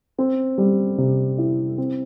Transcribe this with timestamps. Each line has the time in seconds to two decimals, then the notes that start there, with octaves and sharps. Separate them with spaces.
0.18 C4
0.58 G3
0.98 C3
1.38 E4
1.78 C4